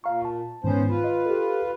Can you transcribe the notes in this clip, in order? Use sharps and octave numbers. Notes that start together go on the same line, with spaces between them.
A#2 F5 A#5 C#6
A5
G#2 D#3 B3 C#4 C5
F4 B4
D#5
G4 A4